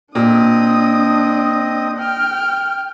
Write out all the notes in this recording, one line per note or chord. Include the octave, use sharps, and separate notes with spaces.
A#2 C4 D4 D#5 D#6
G5 F6